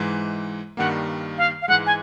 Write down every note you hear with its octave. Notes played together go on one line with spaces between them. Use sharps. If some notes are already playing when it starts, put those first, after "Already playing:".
Already playing: G#2 E3 G#3
G2 D#3 G3 A#3 F#5
F5
F5
G#2 E3 G#3 F#5
G#5